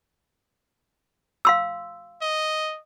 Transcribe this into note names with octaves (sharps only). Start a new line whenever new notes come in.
F5 C6 E6
D#5